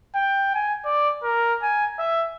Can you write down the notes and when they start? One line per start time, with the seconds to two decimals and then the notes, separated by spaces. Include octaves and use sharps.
0.15 G5
0.54 G#5
0.85 D5
1.23 A#4
1.62 G#5
1.99 E5